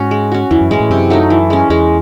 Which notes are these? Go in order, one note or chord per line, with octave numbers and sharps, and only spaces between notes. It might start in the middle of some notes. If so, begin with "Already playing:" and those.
Already playing: G#2 C#4 F#4
G#3
C#4 F#4
E2 E3
F#2
G#2 G#3 C#4
A2
F#2 C3
F#3 A3 D#4
E3
G#3 C#4
E2 G#3